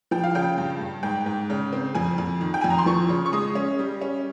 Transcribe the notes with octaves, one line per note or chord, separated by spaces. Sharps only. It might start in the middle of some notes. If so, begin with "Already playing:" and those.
F3 G5
F5
C#3 G5
G2
G2
G#2 G5
G#2
C#3
C4
F2 G#5
F2
D#3
G5
F2 G#5
A#5
C6
F3 C#6
C#3
C#6
G#3 D#6
C#4
G3
C#4